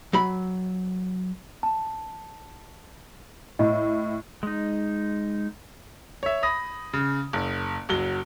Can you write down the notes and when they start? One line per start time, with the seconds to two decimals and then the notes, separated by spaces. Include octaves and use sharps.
0.13 F#3 B5
1.63 A5
3.59 A2 D#5
4.43 G#3 D#4
6.23 C#5 E5
6.43 B5 D#6 A#6
6.93 C#3
7.33 F#1
7.89 F#1 F#3 G7